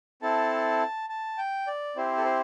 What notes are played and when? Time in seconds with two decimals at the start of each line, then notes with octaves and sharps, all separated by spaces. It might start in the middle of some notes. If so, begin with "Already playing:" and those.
0.22 C4 E4 A4 A5
1.10 A5
1.38 G5
1.67 D5
1.96 C4 E4 G4 C5
2.18 A4
2.25 C5